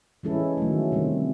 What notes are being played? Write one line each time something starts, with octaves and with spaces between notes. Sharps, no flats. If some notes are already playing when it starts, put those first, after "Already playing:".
E3 G#3 C#4 E4 A4
D#3 F#3 A3
C3 D#3 G3 C4